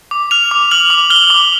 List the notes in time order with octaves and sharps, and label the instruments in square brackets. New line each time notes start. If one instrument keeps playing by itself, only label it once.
[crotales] D6
F6 F7
D6
F6 F#7
D6
F6 G7
D6